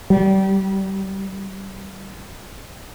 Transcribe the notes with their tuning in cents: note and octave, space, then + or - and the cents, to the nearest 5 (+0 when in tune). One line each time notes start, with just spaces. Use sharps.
G3 -25